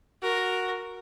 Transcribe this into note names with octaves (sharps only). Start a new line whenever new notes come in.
F#4 A#4